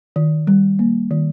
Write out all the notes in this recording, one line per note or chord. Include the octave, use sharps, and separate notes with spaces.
D#3
G3
A#3
D#3